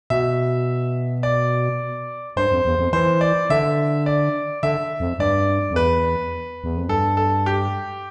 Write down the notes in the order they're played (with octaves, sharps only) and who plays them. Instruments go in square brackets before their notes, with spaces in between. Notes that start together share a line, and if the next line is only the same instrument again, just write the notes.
[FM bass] B2 [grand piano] E5
[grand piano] D5
[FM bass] G2 [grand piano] C5
[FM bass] F2
E2
F2
[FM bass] E3 [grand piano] C5
[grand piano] D5
[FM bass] D3 [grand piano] E5
[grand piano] D5
[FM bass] D3 [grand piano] E5
[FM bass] F2
[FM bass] G2 [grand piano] D5
[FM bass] F2
[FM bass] E2 [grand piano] B4
[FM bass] E2
F2
[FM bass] G2 [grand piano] A4
[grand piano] A4
G4